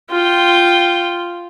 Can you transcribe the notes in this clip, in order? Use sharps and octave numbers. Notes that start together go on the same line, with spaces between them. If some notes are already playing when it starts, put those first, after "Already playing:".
F4 G5